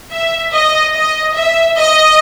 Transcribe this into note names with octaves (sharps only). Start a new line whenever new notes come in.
E5
D#5
D#5
E5
D#5